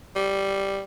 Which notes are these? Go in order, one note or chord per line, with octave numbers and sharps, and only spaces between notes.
G3